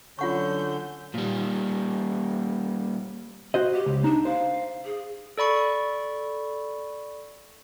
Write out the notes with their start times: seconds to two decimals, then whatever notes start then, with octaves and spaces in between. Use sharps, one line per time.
0.19 D3 F#3 C#4 F4 F#5 C#6 G6
1.15 A#2 G3
3.54 F#4 C5 D#5
3.74 G4
3.86 C#2
4.04 D4 D#4
4.25 C5 F5
4.85 G#4
5.38 A4 D5 B5 C#6